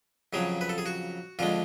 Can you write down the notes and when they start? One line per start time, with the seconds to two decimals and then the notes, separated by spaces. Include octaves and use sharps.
0.33 F2 C#3 F#3 G#4
0.61 B4
0.69 A4
0.78 G#4
0.86 F#4
1.39 F2 D3 G#3 F4